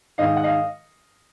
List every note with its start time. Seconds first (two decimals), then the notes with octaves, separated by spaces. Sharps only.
0.18 G#2 D#3 D#5 F5
0.36 F#5
0.44 D#5 F5